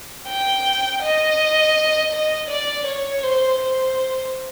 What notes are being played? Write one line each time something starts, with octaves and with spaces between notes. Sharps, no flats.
G5
D#5
D#5
D5
C#5
C5
C5